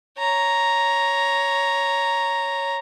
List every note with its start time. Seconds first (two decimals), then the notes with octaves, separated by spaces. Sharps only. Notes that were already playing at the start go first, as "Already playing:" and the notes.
0.18 C#5 A#5